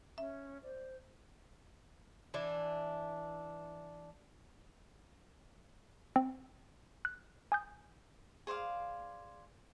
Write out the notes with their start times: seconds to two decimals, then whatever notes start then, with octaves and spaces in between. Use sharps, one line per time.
0.18 C#4 E5
0.63 C5 D5
2.34 E3 D4
6.16 C4
7.05 F#6
7.52 G#5 D#6 G6
8.47 G#4 C5 D5 F5